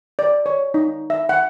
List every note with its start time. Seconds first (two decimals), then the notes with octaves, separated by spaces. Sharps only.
0.19 D5
0.46 C#5
0.74 D#4
1.10 E5
1.29 F#5